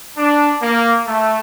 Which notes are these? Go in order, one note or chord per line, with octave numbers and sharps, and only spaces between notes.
D4
A#3
A3